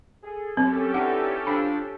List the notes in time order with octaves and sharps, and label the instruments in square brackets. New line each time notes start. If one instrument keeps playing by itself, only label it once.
[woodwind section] G#4 A4
[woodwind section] F#2 F#3 [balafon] C4 [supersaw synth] C#4 G4 A4
[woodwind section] D3 E3 D#4 [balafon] F#5
[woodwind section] F3 D4 [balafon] B5